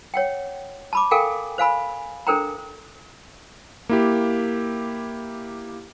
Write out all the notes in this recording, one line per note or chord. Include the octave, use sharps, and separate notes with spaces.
C#5 F#5 G5
A5 B5 D6
A4 A#4 F5 G5 G#5
C5 F5 G#5 B5
D4 A4 A#4 C5 G5 A#5
A#3 E4 G4